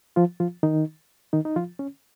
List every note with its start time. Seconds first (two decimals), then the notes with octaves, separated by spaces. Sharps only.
0.16 F3 F4
0.40 F3 F4
0.63 D#3 D#4
1.33 D#3 D#4
1.45 D#4
1.56 F3 F4
1.79 C#4